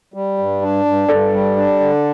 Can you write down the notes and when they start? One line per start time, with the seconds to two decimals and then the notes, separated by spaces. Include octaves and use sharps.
0.14 G3
0.38 G2
0.62 D4
0.85 G2
1.08 G2 A4 D5
1.33 G3
1.56 D4
1.80 D3